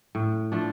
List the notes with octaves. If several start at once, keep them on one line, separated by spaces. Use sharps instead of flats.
A2
F3 A3 D4